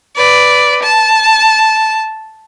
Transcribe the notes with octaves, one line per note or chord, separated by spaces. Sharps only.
B4 D5
A5